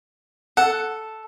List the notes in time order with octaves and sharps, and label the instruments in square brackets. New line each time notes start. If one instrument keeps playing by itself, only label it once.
[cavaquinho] A4 [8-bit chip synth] F#5